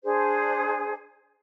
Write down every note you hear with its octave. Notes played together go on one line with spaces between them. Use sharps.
D4 G#4 C5